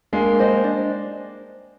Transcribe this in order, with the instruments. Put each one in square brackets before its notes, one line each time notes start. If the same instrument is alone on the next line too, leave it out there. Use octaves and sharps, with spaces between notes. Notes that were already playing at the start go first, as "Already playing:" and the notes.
[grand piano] G#3 A#3 [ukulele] D4
[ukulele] G4 C5 D#5
D4